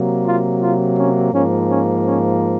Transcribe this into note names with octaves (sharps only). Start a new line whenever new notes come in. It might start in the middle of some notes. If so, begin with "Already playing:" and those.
Already playing: C3 F#3 A#3
F4
F4
C#4
G#2 F3 A#3 C#4
C#4
C#4